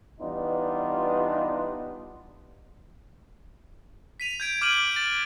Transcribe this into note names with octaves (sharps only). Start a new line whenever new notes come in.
E3 G3 B3 D4 D#4 F4
B6 D#7 F7
G6 G#6 D7
D6 F6 G6 D7 D#7 F#7
A6